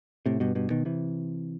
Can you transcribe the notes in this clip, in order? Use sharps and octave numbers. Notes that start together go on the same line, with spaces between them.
A2 C3
G2 B2
G2 B2
B2 D#3
C3 E3